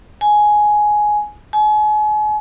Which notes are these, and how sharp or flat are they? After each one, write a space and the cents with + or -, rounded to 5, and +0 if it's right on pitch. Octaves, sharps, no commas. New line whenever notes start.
G#5 +10
G#5 +40